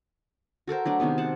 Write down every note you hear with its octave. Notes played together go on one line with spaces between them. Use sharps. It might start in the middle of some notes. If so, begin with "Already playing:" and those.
F#4 A4 A#4 C5
F#3 A3 D4
C3 D#3 G#3 B3
C5 F#5 A5